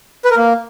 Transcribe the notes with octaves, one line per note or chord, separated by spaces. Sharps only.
B4
A#4
A#3